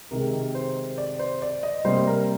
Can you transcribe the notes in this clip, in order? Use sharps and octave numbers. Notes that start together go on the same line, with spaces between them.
C3 D#3 G#3 A#4
C5
D5
C5
D5
D#5
C3 G3 A#3 C5
A#4